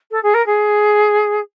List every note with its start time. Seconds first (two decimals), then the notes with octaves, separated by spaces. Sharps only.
0.11 A4
0.23 G#4
0.34 A#4
0.46 G#4